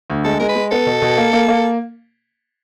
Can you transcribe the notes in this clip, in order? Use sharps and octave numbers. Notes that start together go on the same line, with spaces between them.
D2
G#3 A4
G#3 A#4
B4
G#3
B3 A4
B2
B2
A#3
A#3
A#3